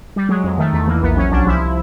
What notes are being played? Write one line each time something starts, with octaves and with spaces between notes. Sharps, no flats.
G3
F#3 G#3
F2 G#3
D#3 A3
E2 A3
E3 A#3
A#1 B3
F#3 C#4
C2 D4
F3 E4